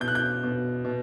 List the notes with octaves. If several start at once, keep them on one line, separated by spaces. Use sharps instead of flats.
B2 G6
F#6
G6
B2
B2